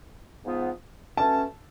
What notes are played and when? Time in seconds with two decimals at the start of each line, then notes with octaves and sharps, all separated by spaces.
0.44 G#2 F3 B3
1.17 B2 A3 C#4 A5